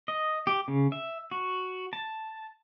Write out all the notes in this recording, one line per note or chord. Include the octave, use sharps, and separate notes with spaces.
D#5
G4
C#3
E5
F#4
A5